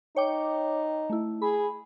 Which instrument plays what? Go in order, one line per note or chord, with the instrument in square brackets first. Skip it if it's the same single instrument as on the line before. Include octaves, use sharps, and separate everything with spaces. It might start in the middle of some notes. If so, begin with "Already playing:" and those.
[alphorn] D#4 [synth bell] C#5 G5 D6
[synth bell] A3 E4
[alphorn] G#4 [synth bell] B5